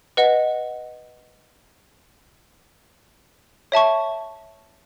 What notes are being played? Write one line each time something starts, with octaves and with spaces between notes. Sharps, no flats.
B4 D#5 F#5
C#5 E5 A5 C#6